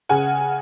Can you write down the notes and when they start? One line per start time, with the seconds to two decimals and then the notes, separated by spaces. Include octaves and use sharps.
0.09 C#3 F#5 G#5